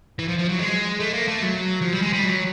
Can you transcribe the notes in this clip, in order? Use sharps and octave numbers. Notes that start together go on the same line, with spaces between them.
E3
F3
F3
F#3
G#3
A3
A#3
A3
F#3
F3
G3
G#3
G3
F#3